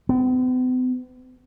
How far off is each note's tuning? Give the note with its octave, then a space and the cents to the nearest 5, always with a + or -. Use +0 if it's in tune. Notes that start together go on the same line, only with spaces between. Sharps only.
B3 +45